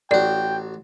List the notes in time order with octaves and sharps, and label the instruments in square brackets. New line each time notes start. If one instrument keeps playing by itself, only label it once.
[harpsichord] A1 F#4 [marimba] D5 [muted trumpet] G5